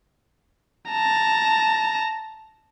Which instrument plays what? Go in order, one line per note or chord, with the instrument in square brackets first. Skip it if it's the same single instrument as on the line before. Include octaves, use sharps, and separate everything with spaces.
[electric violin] A5 A#5